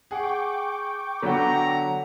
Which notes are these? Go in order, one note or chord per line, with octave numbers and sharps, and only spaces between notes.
G#4 F#5 G5 C#6 D6
D3 F#3 B3 A4 F#5 A#5